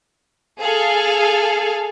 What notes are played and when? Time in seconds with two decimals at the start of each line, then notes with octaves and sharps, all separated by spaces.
0.60 G#4 A4 F5